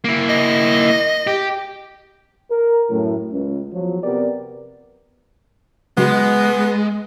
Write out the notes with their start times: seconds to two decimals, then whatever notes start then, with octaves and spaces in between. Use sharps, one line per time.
0.04 A#3 E4
0.29 D#5
1.27 G4
2.51 A#4
2.90 F#2 A2
3.32 C#2
3.73 E2 F3 F#3
4.03 C3 B3 G4 A#4 D5
5.97 C#3 F#3 G#3 B3 F#4